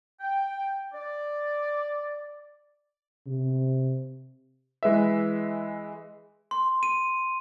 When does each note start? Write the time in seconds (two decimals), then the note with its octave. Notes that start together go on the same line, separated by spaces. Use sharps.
0.21 G5
0.93 D5
3.27 C3
4.83 E3 G#3 B4 E5
6.51 C6
6.83 D#7